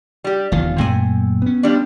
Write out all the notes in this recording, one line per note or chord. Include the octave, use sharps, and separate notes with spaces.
G3 G4
F1 E2 D#3 F4
F#2 A#2 A3 C4 G#5
B3 C#4
F3 G3 D4